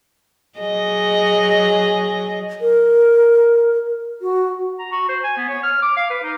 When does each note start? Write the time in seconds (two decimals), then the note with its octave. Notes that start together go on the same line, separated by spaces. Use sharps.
0.59 F#3 G#4 D#5
2.61 A#4
4.22 F#4
4.79 A#5
4.92 F#4
5.09 C5
5.24 G#5
5.37 B3
5.49 C#5
5.63 F6
5.82 D6
5.97 F5
6.10 B4
6.23 D#4